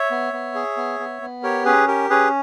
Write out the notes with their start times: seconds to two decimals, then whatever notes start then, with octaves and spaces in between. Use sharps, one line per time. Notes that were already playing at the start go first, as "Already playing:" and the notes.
Already playing: C#5 E5
0.11 B3
0.33 B3
0.55 G#4
0.77 B3
1.00 B3
1.22 B3
1.43 G4 A#4 C#5
1.65 C#4 G#4 B4
1.88 G4 A#4
2.10 C#4 G#4 B4